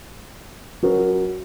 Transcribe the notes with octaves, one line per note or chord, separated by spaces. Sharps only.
F#3 C#4 F#4 A#4